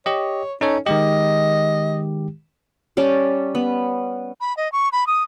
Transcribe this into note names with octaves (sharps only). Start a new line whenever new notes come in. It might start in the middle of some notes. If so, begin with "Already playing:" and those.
G4 C#5 D#5
C#4 D#4 A4 C#5
D#3 G#3 G4 D#5
G3 C#4 A5 D6
B3
B5
D#5
C#6
B5
D#6